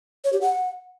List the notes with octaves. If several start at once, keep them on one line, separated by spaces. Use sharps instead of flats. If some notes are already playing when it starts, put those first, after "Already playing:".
C#5
G4
F#5